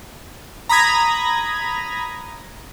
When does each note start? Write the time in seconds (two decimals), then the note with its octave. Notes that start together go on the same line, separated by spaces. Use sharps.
0.69 A#5 B5 D#6 G#6 A#6